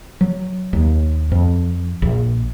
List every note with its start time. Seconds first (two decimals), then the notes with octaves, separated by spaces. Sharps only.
0.21 F#3
0.73 D#2
1.32 F2
2.02 A#1